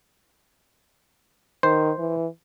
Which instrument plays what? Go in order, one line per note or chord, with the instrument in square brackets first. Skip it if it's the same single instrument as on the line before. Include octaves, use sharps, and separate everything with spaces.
[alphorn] D#3 [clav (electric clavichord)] C5
[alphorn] E3